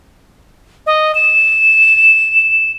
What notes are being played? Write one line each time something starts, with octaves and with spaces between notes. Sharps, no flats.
D#5
E7